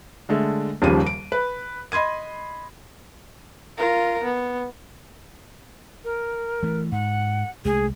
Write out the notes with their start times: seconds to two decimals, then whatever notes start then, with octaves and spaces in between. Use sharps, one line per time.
0.29 D3 G#3 A3
0.82 D#1 D#2 C#3 F3 G3 D#7
1.07 D7
1.32 B4
1.92 D#5 B5 C6 G#6 D#7
3.78 F4 A#4
4.23 B3
6.04 A#4
6.63 E3 A3
6.92 G#2 F#5
7.65 C2 G#3 A3 G#4